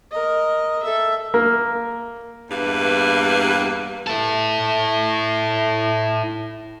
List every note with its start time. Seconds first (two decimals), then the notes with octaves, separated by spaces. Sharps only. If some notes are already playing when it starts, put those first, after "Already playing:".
0.11 A#4 D#5
0.83 A4 E5
1.34 A#3
2.50 E2 G2 A#3 B4
4.07 E4 A4